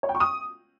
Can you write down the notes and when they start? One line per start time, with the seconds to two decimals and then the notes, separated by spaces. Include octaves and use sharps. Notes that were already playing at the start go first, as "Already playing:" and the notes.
0.03 C#5
0.09 G5
0.15 C#6
0.20 D#6